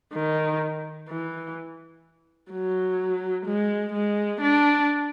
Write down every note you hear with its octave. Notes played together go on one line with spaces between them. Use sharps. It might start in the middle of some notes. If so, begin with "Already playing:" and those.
D#3
E3
F#3
G#3
G#3
D4